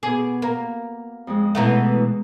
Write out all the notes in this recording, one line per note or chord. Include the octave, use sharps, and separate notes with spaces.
B2 G#4 D6
A#3 A#4 A#5
F2 G#3
B2 E3 A3 F#5 A#5 C#6